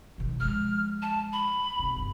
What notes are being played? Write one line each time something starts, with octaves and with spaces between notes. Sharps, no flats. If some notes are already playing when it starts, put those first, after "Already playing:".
B2 D#3
F3 G#3 F6
A5
B5
C3
G1